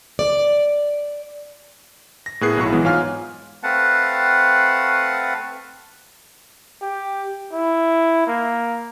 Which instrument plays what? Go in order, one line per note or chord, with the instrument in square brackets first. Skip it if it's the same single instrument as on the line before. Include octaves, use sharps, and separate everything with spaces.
[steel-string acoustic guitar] D5
[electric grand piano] A#6
A2 B3 G#4 A#4 F#6 C7
B1 F#3 E4 C#6
E3 G#3 B3
G#2 F4 C#5 F5 G#5 F6
[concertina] A3 C4 B4 F5 F#5 A5
[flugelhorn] G4
E4
A#3